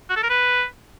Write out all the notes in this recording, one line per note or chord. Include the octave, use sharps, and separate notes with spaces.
F#4
A4
A#4
B4